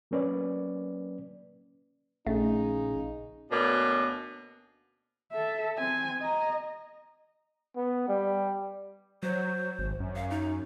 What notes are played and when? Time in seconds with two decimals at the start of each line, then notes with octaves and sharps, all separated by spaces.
0.11 F#3 A#3 C#4 B4 D5
2.27 A#1 C#3 A3 D#4
3.51 D2 B2 A#3 B3 C#4 D4
5.32 A4 E5
5.77 C4 G#5
6.22 D#5 A#5
7.76 B3
8.08 G3
9.23 F#3 C5
9.79 G#1
10.00 F#2
10.16 F5
10.30 D#4